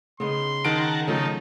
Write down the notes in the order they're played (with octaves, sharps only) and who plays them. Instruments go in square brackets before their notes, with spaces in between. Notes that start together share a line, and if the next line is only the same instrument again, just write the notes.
[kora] C#3 B3 D#4 [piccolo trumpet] C6
[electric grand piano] D#3 D7 [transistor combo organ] A#4 F#5 A5
[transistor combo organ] C#3 A4 [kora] F3 F#3 A3 [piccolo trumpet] D#4